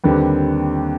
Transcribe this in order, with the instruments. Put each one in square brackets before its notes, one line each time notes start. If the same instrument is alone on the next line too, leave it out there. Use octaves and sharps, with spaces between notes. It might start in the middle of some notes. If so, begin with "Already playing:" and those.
[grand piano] D#2 D3 G3 C4 B4